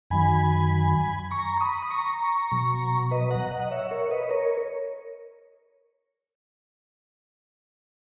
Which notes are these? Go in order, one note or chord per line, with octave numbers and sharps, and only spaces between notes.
F#2 D#3 F#3 G#5 B5
A#5 C#6
C#6
B5 D#6
B5
A#5 C#6
B2 F#3
B4 D#5
F#5 A#5
D#5 F#5
C#5 E5
A#4 C#5
B4 D#5
A#4 C#5